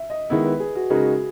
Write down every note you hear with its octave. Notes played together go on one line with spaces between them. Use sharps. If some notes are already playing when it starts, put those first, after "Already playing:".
Already playing: E5
D#5
D#3 G#3 B3 E4
B4
G#4
F#4
C#3 G#3 D#4 F#4 G#4 A#4